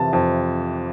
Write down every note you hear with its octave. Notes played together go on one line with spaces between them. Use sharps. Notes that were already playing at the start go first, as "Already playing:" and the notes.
Already playing: F2 C3 E3 A5
F2